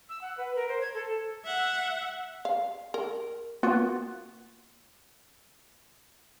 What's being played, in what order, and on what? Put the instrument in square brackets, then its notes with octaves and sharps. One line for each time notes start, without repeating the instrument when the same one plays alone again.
[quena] E6
F#5
B4
A#4
C5
G#6
A4
[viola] E5 F#5
[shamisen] F5
A#4
[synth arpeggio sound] A#3 B3 F4 F#4 F#6 C#7